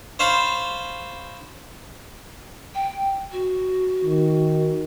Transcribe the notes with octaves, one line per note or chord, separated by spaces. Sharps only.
C5 C#5 F5 A5 B5 C6
G5
F#4
D#3